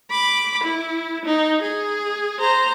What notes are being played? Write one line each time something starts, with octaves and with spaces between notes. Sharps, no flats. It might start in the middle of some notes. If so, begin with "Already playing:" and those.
B5 D6
E4
D#4
G#4
C5 A#5